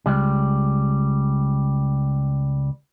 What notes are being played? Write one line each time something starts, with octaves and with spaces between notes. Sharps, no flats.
C#2 G3